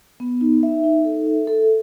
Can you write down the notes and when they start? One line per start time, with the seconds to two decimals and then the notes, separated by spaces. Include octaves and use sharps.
0.20 B3
0.41 D#4
0.63 E5
0.84 D#4
1.05 A4
1.27 E5
1.47 A4